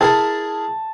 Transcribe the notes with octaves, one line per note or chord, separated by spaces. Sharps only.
E4 G#4 A#4 A5